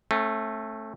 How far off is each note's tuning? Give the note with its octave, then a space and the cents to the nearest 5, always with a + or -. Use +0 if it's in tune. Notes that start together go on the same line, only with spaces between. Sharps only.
A3 +0 C#4 -40